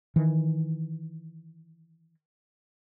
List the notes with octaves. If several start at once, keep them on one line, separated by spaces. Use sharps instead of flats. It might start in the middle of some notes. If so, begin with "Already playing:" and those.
D#3 E3